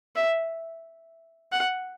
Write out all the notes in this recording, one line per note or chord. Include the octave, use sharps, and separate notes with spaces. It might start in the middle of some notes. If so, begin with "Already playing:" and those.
E5
F#5